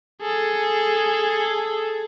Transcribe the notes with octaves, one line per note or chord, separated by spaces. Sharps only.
G#4 A4